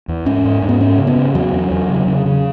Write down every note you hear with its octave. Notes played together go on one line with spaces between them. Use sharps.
E2
G#2 C#4
G#2
G#2
B3
F#2 C#4
C#3
B3
C#3
E2 F#3
E2
E2
C#3
C#3
C#3